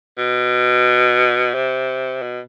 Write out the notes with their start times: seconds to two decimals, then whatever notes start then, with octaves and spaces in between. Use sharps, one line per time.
0.18 B2
1.55 C3
2.22 B2